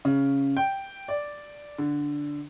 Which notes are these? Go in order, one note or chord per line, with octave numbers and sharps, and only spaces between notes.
C#3
G5
D5
D3